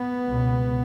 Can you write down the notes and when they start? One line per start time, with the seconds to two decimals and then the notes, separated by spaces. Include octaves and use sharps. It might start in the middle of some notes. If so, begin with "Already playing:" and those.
Already playing: B3
0.28 C#2 B2